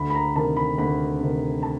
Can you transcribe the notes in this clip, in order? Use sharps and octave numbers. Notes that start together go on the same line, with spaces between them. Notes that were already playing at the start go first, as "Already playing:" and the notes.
Already playing: D2 B5
B5
A#5
C3 D#3 A5
B5
D2 B5
C3 D#3
A5